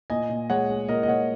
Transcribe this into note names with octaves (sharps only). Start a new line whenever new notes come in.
A#2 D#5 G#5
A#2
G#3 C#5 F#5
G#3
A#2 A#4 D#5
D#5
A#2 C#5 F#5